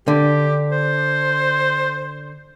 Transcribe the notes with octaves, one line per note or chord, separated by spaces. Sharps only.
D3 G4
C5